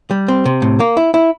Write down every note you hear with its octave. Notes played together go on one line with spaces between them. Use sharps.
G3
C4
C3
A2
A#3
E4
E4